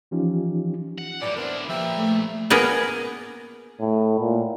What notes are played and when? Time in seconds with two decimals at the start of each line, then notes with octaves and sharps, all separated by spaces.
0.11 E3 F3 C#4 D#4 F4 G4
0.98 F#5
1.21 A2 E3 F#3 G3 D5
1.36 B3 C4 D4 E4 A#4
1.69 F3 A#3 G4 B4 E5
1.97 A3
2.50 A#3 B3 G#4 A#4
3.81 A2
4.20 A#2